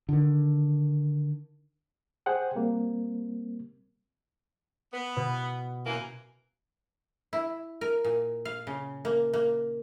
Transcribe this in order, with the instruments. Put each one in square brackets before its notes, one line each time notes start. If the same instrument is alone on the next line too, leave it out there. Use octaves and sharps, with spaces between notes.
[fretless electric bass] D3 D#3
[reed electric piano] G#4 C5 F#5 G5
G3 A#3 C4
[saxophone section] B3
[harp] B2
[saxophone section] F#2 E3 A#3 [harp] G#5
[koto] E4
A#4
A#2
F5
C#3
A#3
A#3